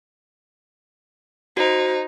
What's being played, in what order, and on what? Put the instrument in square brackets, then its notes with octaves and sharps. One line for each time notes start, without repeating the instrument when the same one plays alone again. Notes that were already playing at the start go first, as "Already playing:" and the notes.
[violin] D#4 [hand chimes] F#4 C5